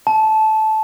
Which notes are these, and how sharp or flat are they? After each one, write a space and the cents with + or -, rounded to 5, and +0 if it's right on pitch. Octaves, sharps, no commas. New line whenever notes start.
A5 -15